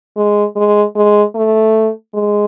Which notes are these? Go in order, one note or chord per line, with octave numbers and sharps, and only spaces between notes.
G#3
G#3
G#3
A3
G#3